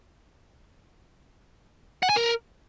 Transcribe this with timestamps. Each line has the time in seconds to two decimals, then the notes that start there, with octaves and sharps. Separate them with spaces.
2.03 F#5
2.09 G#5
2.16 A#4